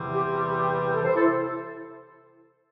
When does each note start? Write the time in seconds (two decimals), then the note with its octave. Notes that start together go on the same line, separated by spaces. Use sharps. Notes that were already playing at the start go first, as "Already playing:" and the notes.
Already playing: E2 C3 E3 G3 C4
0.13 G4
0.33 G4
0.53 G4
0.93 A4
1.04 C5
1.15 E4 A4